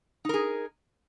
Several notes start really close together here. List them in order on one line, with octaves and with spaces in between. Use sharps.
D#4 A#4 G#4